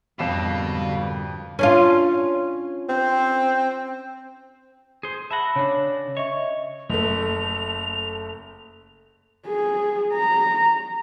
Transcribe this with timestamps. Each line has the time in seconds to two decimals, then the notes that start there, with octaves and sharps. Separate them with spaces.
0.19 F2 G#2 B2 D3 G3 A#3 C7 E7
1.59 C#4 D4 F4
2.89 C4
5.03 G#4 C5
5.31 E5 F#5 A5 B5 A#6
5.56 C#3 D4 C#5
6.17 C#5 D#5 E5 C#6
6.90 F#1 A3 F7
9.47 G#4
10.14 A#5